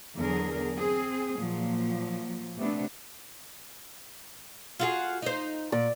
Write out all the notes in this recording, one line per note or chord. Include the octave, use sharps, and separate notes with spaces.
E2 D3 F#3 G#4 A#4
C4 G#4
A#2 F3 F#3
C3 A3 B3 D4
F4 F#4 G#4
D#4 C5
A#2 D5